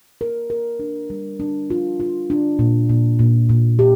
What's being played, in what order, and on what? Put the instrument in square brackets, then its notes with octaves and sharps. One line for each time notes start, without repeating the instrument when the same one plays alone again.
[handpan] A#4
A#4
D4
G3
D4
F4
F4
D4
A#2
A#2
A#2
A#2
G4